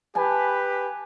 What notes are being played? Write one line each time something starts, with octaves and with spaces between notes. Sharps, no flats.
G4 B4 G#5 A5